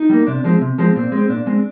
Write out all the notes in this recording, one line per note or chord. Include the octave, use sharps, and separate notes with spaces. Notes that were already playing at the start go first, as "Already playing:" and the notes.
Already playing: D#4
G3 A#3
C3 D4
F3 G#3 C4
C3
F3 G#3 C4
A#2 C4
G#3 C4
A#2 D4
G#3 C4